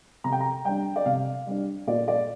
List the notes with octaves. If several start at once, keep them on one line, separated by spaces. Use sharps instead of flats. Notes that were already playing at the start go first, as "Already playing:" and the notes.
C3 A#5
G5
A#5
G3 D4 G5
D5
C3 F5
G3 D4
A#2 D5
D5